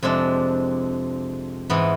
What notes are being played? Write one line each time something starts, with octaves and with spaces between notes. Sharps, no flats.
F2 C3 G#3 D4
G#2 E3 B3